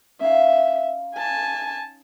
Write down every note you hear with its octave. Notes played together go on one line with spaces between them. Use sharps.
C#4 D#4 E5 F5
G#5 A5